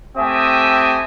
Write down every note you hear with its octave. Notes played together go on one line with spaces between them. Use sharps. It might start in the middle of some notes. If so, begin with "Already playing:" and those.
A3 C4 G4 E5 G#5 D#6